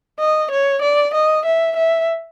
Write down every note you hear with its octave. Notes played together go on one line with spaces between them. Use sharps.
D#5
C#5
D5
D#5
E5
E5